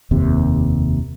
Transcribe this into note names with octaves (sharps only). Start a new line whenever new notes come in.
F1 D#2 C3